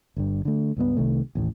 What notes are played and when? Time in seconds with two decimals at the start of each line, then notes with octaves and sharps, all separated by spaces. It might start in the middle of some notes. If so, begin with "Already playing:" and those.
0.17 G1 G2
0.45 D3 A3
0.77 C#2 G2 A3 B3
0.97 C2 C3 D#3 A3
1.35 A1 D#2 A2